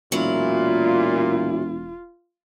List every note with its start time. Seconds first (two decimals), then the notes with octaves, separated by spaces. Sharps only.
0.12 E1 A#2 F#3 E4 F4